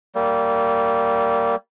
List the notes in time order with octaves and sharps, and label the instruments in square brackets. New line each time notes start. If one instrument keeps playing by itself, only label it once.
[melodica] G3 A#3